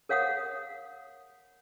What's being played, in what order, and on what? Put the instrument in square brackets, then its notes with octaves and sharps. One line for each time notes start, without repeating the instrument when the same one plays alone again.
[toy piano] A#4 C#5 F5 F#5 D#6